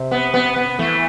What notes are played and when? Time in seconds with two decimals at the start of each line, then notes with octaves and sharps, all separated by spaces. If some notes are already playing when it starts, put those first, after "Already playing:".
Already playing: C3
0.11 B3
0.34 B3
0.56 B3
0.79 E3 A3